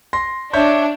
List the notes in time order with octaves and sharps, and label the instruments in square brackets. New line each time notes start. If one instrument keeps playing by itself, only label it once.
[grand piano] C6 A#6
[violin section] D4 [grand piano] C#5 E5 G6